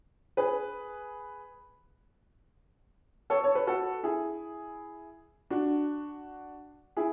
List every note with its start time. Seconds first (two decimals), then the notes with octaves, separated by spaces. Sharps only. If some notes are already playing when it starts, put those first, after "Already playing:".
0.37 G#4 B4
3.30 A4 C#5
3.44 C#5
3.55 B4
3.67 F#4 A4
4.03 E4 G#4
5.50 D4 F#4
6.97 E4 G#4